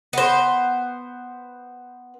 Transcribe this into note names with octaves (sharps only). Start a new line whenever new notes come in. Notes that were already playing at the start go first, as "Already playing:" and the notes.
B3 C5